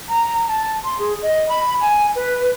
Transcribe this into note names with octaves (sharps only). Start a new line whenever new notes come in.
A#5
A5
C6
G#4
D#5
B5
G#5
B4